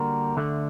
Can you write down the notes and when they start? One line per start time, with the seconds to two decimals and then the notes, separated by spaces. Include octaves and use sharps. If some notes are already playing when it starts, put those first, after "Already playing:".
Already playing: D3 G3 A#3 F#4 A#4
0.36 D2 D3 A3